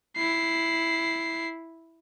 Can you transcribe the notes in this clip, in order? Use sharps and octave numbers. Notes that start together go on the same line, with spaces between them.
E4 C7